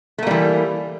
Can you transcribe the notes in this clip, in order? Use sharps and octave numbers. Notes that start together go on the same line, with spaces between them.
E3 G3 A3 A#3